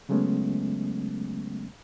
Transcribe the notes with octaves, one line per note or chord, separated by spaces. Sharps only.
C#3 F#3 G#3 A3 B3 C#4